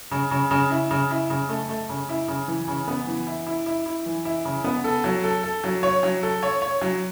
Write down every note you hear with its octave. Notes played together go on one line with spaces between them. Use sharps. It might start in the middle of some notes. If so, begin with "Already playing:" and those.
C#3
C#3
C#3
E4
C#3
E4
C#3
A3
A3
C#3
E4
C#3
E3
C#3
B3
E3
E4
E4
E4
E4
E3
E4
C#3
B3
A4
F#3
A4
A4
F#3
C#5
F#3
A4
C#5
C#5
F#3